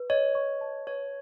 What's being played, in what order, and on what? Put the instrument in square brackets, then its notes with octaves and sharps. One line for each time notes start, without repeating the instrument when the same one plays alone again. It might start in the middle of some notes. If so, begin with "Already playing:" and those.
Already playing: [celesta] B4
[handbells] C#5 [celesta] D#5
[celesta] C#6
A5
[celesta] B4 [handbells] C#5